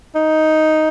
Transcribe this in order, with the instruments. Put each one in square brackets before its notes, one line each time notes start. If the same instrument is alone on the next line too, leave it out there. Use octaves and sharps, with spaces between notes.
[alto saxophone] D#4